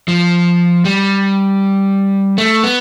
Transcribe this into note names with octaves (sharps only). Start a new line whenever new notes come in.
F3
G3
A3
B3